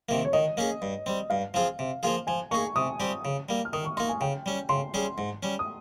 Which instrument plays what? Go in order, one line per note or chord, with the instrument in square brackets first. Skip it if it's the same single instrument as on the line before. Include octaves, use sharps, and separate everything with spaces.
[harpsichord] C3 D#3 A#3
[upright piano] C#5
[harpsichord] D#3 [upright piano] D#5
[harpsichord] A#3 C#4 G#4
G2
G3 C4
[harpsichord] G2 [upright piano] F5
[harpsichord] F3 C4 F4 G#4
C3
F3 A#3 F4 G#4
[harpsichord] F3 [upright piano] G#5
[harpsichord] A#3 D#4 G#4 [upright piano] C#6
[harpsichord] C3 [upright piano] D#6
[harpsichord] G3 C4 G4
C#3
G3 A#3
[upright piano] F6
[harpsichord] D#3 [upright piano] D#6
[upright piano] C#6
[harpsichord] A#3 D#4 [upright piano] C6
[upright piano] G#5
[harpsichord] C#3 [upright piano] G5
[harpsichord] G3 C#4
[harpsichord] C#3 [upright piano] C6
[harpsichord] G3 C#4 G#4
G#2
G3 C#4
[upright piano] D#6